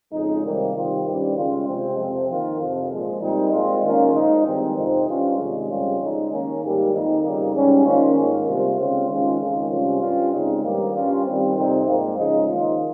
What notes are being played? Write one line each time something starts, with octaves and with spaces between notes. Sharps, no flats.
F2 C#3 G#3 D#4
C3 D#3 G3 A#3
C3 D#3 G3 C4 F4
G2 D#3 G3 C#4
C#3 G#3 C#4 F4
C3 F3 G#3 C4
F2 C3 F3 C4
D#3 A#3 F4
F2 C3 F3
A#2 F3 G#3
A#2 G3 C4 D#4
A#2 G#3 C4 F4
D#3 A#3 C#4 F4
A#2 F3 G#3 D#4
G2 D#3 G#3 C4
F2 C3 F3 C4 D#4
G2 G3 C#4 F4
C3 D#3 G#3
F2 C#3 G3 C#4 F4
C#3 G#3 D#4
D#3 A#3 C#4
G#2 D#3 G3 A#3
F2 D#3 A#3 D#4
F2 C#3 G3 A#3 D#4
G#2 G3 C#4
D#3 A#3 C#4 F4
G#2 D#3 A#3
C3 G3 A#3 F4
C#3 G#3 C4 F4
D#3 G#3 C#4 F4
F2 D#3 G#3 C#4 F4
C3 G3 C#4 F4
G2 G3 C#4 F4
C#3 G#3 C4 D#4
G2 D#3 G3 A#3
G2 G3 C#4 F4
D#3 G3 C4
F2 C3 G3 C4 D#4
G#2 F3 A#3
C#3 F3 G#3 D#4
D#3 A#3 F4